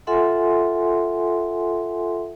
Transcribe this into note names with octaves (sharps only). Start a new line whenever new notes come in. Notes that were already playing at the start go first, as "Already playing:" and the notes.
F4 A4 E5 F#5 G#5 C6